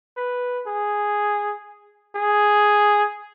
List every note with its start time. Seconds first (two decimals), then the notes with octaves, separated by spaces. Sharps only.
0.17 B4
0.67 G#4
2.16 G#4